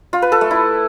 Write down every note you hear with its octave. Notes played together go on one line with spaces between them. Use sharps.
F4
B4
A4
A3
E4